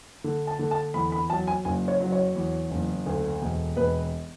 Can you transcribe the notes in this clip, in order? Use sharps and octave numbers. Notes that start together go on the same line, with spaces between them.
D3
A5
D3
A5
E2 B5
B5
F#3 A5
G#5
F#1 G#5
C#5
F#3
C#5
E2
F#1
D2
E1
E1 B4